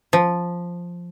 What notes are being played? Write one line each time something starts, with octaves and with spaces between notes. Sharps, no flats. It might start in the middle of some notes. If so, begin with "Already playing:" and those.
F3